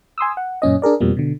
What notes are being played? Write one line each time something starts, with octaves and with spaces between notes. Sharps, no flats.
G#5 C6 D#6 E6
F#5
F#2 A#2 C#4 D#5
D4 G#4 A#4 D5
F2 B2 F3 G3 A#3
B2 D3